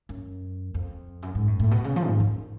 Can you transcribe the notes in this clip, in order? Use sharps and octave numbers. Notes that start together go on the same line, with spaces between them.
F#2
F2
F#2
G#2
F#2
A2
B2
C#3
F3
G#2
F#2